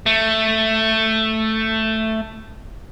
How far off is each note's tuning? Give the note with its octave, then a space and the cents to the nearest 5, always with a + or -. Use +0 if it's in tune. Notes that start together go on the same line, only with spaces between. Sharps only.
A3 +5